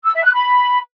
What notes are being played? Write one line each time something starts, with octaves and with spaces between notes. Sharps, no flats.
E6
E5
F#6
B5